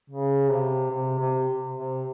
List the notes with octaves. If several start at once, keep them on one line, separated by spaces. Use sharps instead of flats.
C#3
C3
C3
C3
C3